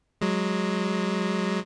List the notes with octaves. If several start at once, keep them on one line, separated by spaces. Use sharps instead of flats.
F#3 G#3